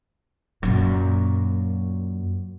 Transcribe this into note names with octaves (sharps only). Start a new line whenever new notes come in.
F#2 A#2